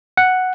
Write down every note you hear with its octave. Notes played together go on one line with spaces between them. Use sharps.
F#5